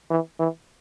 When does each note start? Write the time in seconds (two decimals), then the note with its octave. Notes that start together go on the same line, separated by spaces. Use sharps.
0.11 E3
0.39 E3